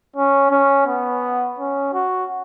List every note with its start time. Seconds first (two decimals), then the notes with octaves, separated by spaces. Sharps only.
0.16 C#4
0.51 C#4
0.87 B3
1.58 C#4
1.93 F#4